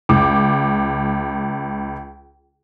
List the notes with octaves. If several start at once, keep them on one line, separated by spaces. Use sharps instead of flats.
C#2 D6